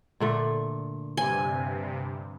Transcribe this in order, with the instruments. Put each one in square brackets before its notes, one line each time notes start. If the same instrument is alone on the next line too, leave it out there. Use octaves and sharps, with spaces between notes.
[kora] A#2 D3 A3
[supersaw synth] G2 C3 [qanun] G#5